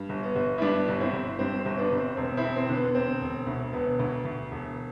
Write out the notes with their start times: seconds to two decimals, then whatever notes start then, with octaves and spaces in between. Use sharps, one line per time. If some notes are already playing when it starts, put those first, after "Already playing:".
Already playing: G2
0.09 G1
0.23 B3
0.35 G1
0.58 E4
0.61 G2 B3 D4
0.88 G1
1.00 C4 E4
1.13 G1
1.39 G2 C4
1.59 C4
1.65 G1
1.78 B3 D4
1.92 G1
1.98 C4
2.17 E1 C4
2.37 C4 E4
2.44 E1
2.56 C4
2.69 D3
2.75 B3
2.95 E1 C4
3.22 E1
3.47 D2
3.73 E1 B3
3.99 D2
4.25 D2
4.51 E1